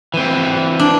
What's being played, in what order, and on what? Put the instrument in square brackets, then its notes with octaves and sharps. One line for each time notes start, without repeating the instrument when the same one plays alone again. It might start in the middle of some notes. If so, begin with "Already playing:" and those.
[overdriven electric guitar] E3 C4
[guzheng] D4